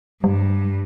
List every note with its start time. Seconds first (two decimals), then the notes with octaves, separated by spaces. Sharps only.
0.24 G2 G3